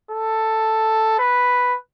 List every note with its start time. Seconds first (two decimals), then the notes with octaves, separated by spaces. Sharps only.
0.11 A4
1.19 B4